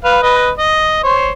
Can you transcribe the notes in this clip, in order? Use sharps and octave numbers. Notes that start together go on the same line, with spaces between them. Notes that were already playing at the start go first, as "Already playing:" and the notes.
B4 F5
B4 D#5
D#5
C5 C#5